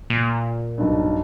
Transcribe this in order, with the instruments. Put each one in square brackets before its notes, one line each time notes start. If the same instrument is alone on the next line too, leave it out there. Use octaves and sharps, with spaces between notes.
[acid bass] A#2
[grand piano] B1 G2